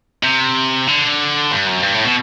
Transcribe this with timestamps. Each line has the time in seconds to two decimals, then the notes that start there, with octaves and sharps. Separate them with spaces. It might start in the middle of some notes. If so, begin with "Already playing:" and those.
0.23 C3
0.87 D3
1.51 G2
1.67 F#2
1.83 G2
1.94 A2
2.05 B2